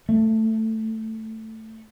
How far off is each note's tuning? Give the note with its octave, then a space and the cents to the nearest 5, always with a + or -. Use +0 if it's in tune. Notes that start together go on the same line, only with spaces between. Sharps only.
A3 +10